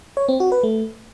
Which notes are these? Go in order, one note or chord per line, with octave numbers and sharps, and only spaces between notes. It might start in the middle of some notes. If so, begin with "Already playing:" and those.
C#5
C4
F#4
B4
A3